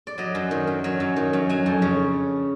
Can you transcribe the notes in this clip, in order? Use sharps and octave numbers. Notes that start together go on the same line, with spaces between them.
D5
F#3 D#5
F#2
D#3
F#2
F#3
F#2
D#3
F#2
F#3 G#5
F2
C#3